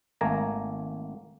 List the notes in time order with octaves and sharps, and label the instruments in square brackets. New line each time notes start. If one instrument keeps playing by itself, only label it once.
[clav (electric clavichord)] G#1 A3 A#3 G#5 A#5